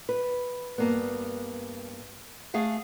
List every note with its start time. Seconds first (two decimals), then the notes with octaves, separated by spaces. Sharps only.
0.09 B4
0.78 G2 A#3 B3
2.54 A3 G#4 F5 F#5